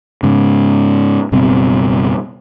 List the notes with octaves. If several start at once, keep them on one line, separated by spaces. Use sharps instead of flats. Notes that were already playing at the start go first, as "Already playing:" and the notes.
G#2 C#3
F#1 B2 G3 C4